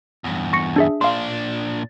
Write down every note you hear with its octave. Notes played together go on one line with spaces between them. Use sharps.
E2 G2
C#6 A#6 C#7
D4 G#4 E5
A#2 D4 F5 C6